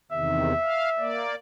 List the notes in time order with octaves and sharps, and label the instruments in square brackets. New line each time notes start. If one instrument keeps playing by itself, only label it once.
[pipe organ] E2 C3 D#3 [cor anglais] E5
[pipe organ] F5
A#3 D5